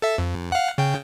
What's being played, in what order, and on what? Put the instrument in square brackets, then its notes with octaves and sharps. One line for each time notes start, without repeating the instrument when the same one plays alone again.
[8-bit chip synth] A4 E5
F2
F5 F#5
C#3 G5